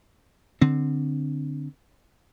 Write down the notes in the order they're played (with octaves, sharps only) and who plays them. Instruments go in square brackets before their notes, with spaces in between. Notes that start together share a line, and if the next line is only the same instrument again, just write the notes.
[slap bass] D3 C4